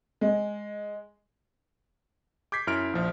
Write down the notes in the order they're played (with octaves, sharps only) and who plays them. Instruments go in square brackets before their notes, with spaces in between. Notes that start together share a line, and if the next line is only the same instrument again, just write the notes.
[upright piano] G#3
[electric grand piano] D6 G6 G#6 B6 C7
F#2 E4 F6 D7
A#1 F3